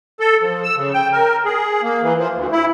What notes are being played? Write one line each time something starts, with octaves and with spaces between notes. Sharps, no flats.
A4
F3
E6
C#3
G5
A#4
G#4
A#3
E3
F3
D2
E4